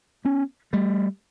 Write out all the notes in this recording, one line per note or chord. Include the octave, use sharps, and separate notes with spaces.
B3 C#4
G3 A3